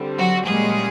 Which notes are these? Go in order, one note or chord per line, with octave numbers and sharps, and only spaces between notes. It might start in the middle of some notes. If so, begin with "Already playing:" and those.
Already playing: D3 G3 C4
F#3 F#4
A#2 G3 G#3 A#3 C#4 G#4